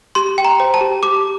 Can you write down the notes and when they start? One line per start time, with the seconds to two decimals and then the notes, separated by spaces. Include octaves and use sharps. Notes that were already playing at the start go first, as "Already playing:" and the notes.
0.15 G4 C6
0.38 G5
0.45 A#5
0.60 C5
0.74 A5
0.81 G4
1.03 G4 D6